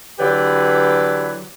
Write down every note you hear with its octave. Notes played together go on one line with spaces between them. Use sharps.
D3 E3 F#3 G4 B4 D5